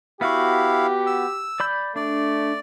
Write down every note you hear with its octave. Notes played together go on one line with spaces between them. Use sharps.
B3 E4 F#4 G4 F5 C#6
E6
D5 B5 G6
A3 D4 D5